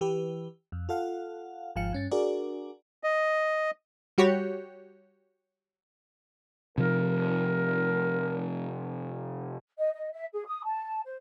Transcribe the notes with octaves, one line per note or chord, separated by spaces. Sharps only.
E3 G4 B4
F2
F4 A4 F5 F#5
G#1 G#2 F3 F5 C#7
G2 C#4 A6
D4 F#4 G#4 A#4 D5
D#5
G3 F#4 G4 C#5
C3 F3 A#4
D#5
D#5
E5
G#4
D#6
A5
C5